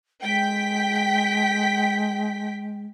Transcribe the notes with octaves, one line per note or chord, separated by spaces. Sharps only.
G#3 G5 B6